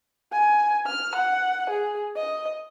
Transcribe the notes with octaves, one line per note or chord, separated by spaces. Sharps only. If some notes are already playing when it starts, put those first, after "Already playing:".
G#5
F6
F#5
G#4
D#5